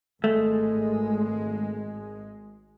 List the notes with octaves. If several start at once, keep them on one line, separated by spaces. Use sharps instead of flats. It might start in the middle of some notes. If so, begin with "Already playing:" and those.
G#1 G#3 A3